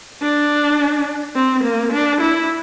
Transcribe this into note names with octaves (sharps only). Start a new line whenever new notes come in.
D4
C4
A#3
D4
E4